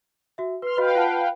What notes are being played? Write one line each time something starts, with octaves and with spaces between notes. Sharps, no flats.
F#4 E5
B4 C6 F6
F#4 B4 D#5 F5 G5 B5
F4 F#5 A5